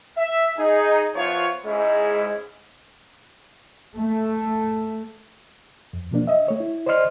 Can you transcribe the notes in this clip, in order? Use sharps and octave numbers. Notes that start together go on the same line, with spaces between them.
E5
D#4 G#4
F3 B3 E4 F4 C5 C#5
G#2 G#3 C#4 E4
A3
F2
B2 F3 A#3 D4
D#5 E5
A3 C#5
E4
C5 D5 D#5 C6 F6